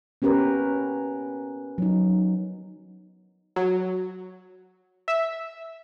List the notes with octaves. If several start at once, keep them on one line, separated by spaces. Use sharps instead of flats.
B3 C#4 G4 A#4 B4
F#3 D#4
F#3
E5